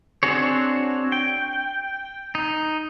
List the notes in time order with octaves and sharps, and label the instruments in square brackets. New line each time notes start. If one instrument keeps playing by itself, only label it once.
[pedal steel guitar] C4 D4 F#4 G#4 C#5
G5
D#4